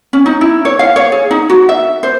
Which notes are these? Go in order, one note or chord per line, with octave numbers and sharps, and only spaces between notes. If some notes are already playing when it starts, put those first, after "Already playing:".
C#4
D#4
E4
C#5
F5
C#5
G#4
D#4
F#4
E5
C5